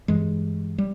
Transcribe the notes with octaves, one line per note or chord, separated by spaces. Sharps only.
G2 E3 G#3
G3